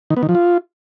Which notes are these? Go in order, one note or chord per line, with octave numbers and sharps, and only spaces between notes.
D#3
B3
D#3
F3
F4